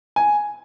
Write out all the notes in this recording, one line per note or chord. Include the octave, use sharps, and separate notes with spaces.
G#5